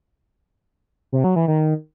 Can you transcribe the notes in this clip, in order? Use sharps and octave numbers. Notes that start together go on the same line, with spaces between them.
C3
F#3
E3
D#3